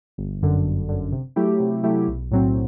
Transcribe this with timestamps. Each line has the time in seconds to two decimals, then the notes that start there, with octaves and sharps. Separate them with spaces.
0.18 G1
0.42 F#2 D3
0.65 G1
0.89 F#2 D3
1.12 C3
1.36 F#3 A3 E4 G4
1.60 C3
1.83 F#3 A3 E4 G4
2.08 B1
2.31 A2 F#3 C4